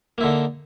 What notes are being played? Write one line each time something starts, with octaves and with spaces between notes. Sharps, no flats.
D3 A#3 D#4 E4